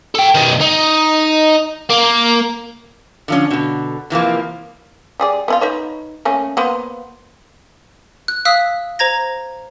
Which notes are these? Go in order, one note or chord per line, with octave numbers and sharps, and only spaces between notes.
A4 G5
B2 D#3
D#4
A#3
D3 F3 C#4
B2 D3
C3 E3 F3 A#3
G3 G#4 D5
B3 E4 F4
D#4 B4 C#5
A3 A#3 C#4
A#3 B3 C5
F#6
F5 D#6 E6 F#6 B6
C5 A#5 G#6 A#6